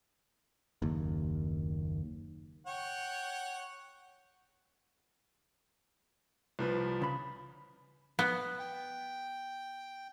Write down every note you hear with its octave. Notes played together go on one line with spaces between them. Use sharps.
F#1 D#2
C#5 F#5 G5
C2 F3 B4
C#3 B5
B3
G5